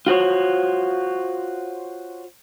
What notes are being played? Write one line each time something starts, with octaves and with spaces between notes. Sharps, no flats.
F4 F#4 C5 C#5